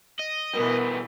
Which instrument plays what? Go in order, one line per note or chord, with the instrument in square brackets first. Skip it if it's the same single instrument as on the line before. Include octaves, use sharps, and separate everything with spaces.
[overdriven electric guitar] D#5
[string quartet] B2 E3 [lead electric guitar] G3 B3 [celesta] A#4 D#6